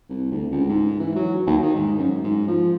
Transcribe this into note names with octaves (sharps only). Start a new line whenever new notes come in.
C2
D2
C#2
G#2
E3
F#3
D#2
D#3
G#2
F#2
G#2
F3